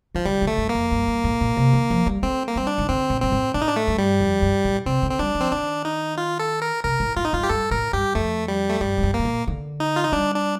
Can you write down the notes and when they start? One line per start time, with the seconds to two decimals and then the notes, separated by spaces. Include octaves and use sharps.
0.15 D#3 F3
0.25 D3 G3
0.42 D3
0.47 A3
0.58 G2
0.69 A#3
0.74 F2
0.92 G2
1.08 G2
1.24 A2
1.41 A#2
1.57 C3
1.73 D#3
1.90 F3
2.06 G3
2.23 A3 C4
2.48 A#3
2.56 G3 C4
2.67 D4
2.78 D#3
2.89 D3 C4
3.10 A#2
3.21 G2 C4
3.32 A2
3.54 A2 D4
3.61 D#4
3.69 D4
3.76 A3
3.88 G2
3.98 G3
4.21 F2
4.42 G2
4.65 A2
4.86 C3 C4
5.03 D3
5.11 C4
5.19 G3 D4
5.35 F3
5.41 C4
5.51 D#3 D4
5.85 D#4
6.17 F4
6.39 A4
6.62 A#4
6.84 C3 A#4
7.00 A2
7.16 A2 F4
7.25 D#4
7.33 G2 F4
7.43 G4
7.49 G2 A4
7.71 A2 A#4
7.93 G2 G4
8.15 F2 A3
8.48 G3
8.69 A3
8.81 G2 G3
8.98 A2
9.03 G2
9.14 A#3
9.19 A2
9.25 A#2
9.48 D3
9.80 D#4
9.96 F4
10.04 D#4
10.12 G3 D4
10.35 D4